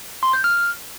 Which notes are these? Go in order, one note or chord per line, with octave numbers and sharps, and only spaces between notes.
C6
G6
F6